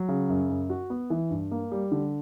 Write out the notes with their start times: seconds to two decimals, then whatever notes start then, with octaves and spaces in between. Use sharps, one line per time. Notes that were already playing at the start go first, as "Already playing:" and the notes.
Already playing: F#3
0.08 C#3
0.29 F#2
0.50 F#2
0.70 F#4
0.90 B3
1.10 E3
1.30 G2
1.51 A#3
1.72 G3
1.92 D3